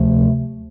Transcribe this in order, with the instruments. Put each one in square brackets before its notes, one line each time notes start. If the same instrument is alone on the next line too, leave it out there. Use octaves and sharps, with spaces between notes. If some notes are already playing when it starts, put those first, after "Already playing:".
Already playing: [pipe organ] D2 C3 F3 A3